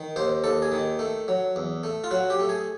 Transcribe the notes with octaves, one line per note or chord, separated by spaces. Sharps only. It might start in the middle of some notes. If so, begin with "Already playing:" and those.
Already playing: D#3
D#2 C5
D#2 A4
G#4
D#3
A3
F#3
E2
A3
F4
F#3 F#4
G4
A3
G#4